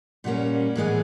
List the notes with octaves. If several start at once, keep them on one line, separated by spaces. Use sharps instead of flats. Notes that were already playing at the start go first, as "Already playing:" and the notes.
A#2 G3 A#3 C#4 F#5
A2 E3 G#3 B3